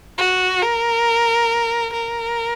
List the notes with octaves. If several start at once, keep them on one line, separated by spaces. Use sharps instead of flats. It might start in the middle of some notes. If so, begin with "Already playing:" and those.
F#4
A#4
A#4